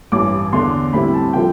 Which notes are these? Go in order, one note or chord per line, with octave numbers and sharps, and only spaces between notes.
A1 G2 E3 D6
E2 D3 A3 D4 C6
A2 G3 C4 E4 B5
A5
D3 F3 A3 G5